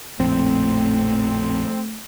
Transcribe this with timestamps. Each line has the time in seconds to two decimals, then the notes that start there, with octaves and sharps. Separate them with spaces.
0.20 A#1 F2 A2 A3 C4